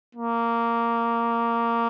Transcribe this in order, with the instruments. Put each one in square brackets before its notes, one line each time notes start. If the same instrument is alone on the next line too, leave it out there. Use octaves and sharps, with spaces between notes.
[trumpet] A#3